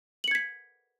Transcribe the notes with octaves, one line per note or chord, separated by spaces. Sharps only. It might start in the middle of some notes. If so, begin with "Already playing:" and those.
G#6 B6 C#7 F#7